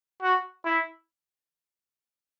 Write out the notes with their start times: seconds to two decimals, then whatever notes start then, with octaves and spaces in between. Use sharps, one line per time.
0.22 F#4
0.65 E4